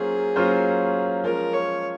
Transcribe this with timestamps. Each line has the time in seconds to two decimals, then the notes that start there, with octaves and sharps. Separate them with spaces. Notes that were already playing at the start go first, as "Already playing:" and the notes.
Already playing: F#3 A#3 C#4 F4 G#4 C5
0.36 F#3 A#3 C#4 F4 C5
1.23 F3 G#3 C#4 F4 A#4
1.53 C#5